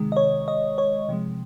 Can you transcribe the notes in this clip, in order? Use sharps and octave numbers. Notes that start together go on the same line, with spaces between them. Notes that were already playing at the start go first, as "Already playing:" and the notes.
Already playing: C3 D#3 G#3
D#5
C#5
D#5
C#5
C3 F3 G#3